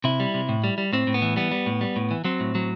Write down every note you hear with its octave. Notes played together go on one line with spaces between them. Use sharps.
C3 E4
G3
C3
A2
G3
G3
A2 C4
A2
B3
E3
G3 B3
G3
A2
G3
A2
E3
F#3 C4
A2
F#3